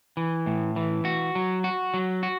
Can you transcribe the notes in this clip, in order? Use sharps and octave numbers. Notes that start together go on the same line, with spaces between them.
E3
A2
E3
F#4
F#3
F#4
F#3
F#4